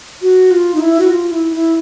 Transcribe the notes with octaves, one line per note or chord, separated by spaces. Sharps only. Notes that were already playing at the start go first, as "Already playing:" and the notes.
F#4
F4
D#4
E4
F#4
F4
E4
E4